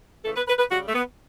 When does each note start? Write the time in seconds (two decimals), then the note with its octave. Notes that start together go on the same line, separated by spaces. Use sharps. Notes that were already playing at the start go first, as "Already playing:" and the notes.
0.24 C#3 E3 A3 A4
0.36 B4
0.47 B4
0.59 B4
0.71 C#3 G3 F#4
0.87 A3
0.94 B3